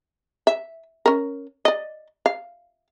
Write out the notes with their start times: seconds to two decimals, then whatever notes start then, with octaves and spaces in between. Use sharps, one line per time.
0.47 E5
1.06 C#4 A#4
1.65 D5 D#5
2.26 F5